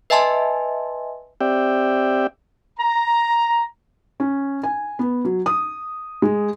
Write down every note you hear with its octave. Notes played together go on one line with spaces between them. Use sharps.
B4 D#5 E5 G#5 A5 C6
C4 G4 D5 E5 G5
A#5
C#4
G#5
B3
F#3
D#6
G#3